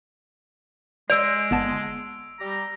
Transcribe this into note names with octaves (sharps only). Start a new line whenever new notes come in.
G#3 D5 E6 D7 F7
G1 B3 A5
G3 G4 A#5